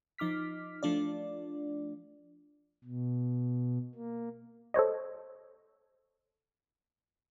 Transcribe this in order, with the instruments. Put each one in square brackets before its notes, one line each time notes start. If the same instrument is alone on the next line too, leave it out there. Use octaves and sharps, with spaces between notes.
[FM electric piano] F3 D#4 D6 F6 B6
F3 A3 D4 F4 D5
[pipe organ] B2
A#3
[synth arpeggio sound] A4 C5 C#5 D#5